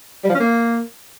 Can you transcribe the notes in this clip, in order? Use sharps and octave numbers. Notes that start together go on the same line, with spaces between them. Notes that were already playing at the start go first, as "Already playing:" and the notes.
G3
F3
C#4
A#3